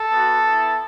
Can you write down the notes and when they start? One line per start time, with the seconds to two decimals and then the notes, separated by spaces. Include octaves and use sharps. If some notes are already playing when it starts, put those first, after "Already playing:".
Already playing: A4
0.11 B3 F#4
0.45 B3 E4